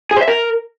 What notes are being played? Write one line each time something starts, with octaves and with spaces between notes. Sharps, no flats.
G#4
C5
E5
A#4